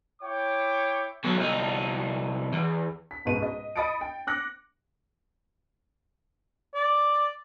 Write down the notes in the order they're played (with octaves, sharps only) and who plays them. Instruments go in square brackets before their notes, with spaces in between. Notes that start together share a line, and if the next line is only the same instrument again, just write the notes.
[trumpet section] E4 C#5 G5 D6
[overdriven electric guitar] B2 F#3
C2 D#4
E2
[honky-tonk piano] B6
C#2 G#2 B2 B4 D#7
D#5
D#5 B5 D#6 A6 C#7 D7
G5
D6 F#6 A#6 C#7
[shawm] D5